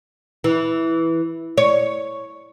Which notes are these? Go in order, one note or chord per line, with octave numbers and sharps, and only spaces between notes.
E3
C#5